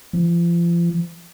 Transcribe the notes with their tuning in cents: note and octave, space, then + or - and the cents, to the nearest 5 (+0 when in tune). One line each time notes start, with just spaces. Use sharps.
F3 -35